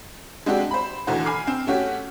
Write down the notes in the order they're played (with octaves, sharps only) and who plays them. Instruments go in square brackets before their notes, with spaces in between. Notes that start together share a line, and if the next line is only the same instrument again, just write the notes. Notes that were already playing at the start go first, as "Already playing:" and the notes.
[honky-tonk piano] G#3 C4 D4 F#4 G4
C5 B5
D#2 D3 E3 A3 F#4 C5
G#5 B5 D6 F6 C7
C4
A3 C#4 F#4 G4